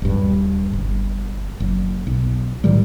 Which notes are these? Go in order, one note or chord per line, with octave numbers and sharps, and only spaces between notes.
D#1 G2
G1
F#1
B1
A2 D#3 G3